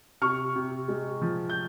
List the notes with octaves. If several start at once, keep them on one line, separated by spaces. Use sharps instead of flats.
C3 C#6 F6
C3
G#3
F3
G6